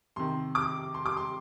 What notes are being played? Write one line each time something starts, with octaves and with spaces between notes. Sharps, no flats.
C3 D#3 C6
D6
C6
D6
C6